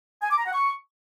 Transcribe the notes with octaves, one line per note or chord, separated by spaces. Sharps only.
G#5
D6
A#5
F#5
C#6